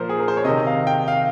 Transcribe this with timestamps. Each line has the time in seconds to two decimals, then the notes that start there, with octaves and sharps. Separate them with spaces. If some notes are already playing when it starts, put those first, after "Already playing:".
Already playing: A#2 F3 A#4 C5
0.09 G#4
0.19 A#4
0.28 C5
0.37 C#5
0.45 C3 D#3 D#5
0.67 F5
0.87 G5
1.08 F5